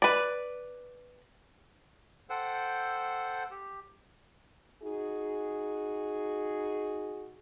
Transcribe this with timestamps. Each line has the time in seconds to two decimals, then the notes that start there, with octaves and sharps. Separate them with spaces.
0.02 B4 D5
2.30 A4 C5 F#5 G5
3.51 G4
4.83 D#4 F#4 G#4